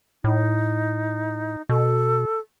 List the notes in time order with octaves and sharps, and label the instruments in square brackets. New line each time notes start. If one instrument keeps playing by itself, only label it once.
[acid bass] A2 [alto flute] D#4
[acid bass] B2 [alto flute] A4